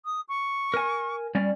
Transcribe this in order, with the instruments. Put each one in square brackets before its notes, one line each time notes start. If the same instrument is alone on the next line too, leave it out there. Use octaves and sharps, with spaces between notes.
[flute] D#6
C#6
[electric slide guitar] A#4 G#5
G3 C#4 D5